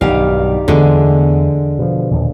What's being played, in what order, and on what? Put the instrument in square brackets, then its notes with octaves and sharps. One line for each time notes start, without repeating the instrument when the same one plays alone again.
[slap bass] B1 G2 [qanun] D#3 G3 F5
[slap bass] E2 A3 B3 [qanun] D3 G#3
[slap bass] B2 F3
D#2 A#2